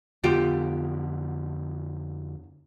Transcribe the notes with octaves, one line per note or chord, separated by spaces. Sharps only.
F2 D3 B3 F4 G4